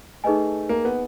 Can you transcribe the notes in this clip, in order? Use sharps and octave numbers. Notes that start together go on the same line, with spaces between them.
A3 D#4 G#4 B4 D#5 G#5
A#3
B3